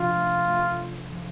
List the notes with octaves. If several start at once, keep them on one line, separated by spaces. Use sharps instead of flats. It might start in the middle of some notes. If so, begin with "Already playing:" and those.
Already playing: C3 F3 D4 F4
A3
A3
A3
F3